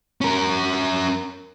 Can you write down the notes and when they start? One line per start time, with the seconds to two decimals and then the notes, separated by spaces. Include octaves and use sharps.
0.21 C#4 A#4